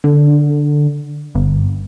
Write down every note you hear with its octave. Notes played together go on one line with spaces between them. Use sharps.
D3
G1